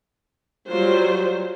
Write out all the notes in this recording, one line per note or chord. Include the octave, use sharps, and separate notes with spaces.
F#3 G3 F4 C5